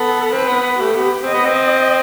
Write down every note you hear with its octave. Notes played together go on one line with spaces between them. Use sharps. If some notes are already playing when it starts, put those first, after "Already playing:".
Already playing: B3 A4
C4 B4
B3
B3
A3 G4
B3
C4
D#5
B3
C4